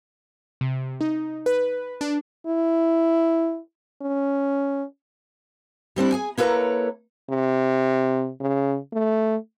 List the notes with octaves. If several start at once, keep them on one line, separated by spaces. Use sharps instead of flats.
C3
D#4
B4
D4
E4
C#4
G3 C4 D4 E4
G#4 G#5
A#3 E4 A4 B4 C#5 A#5
C3
C#3
A3